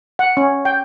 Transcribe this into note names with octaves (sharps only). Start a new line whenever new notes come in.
F#5
C#4
G5